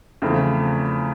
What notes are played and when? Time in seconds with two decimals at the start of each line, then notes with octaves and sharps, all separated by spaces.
0.22 E2 C#3 F3 A3 C4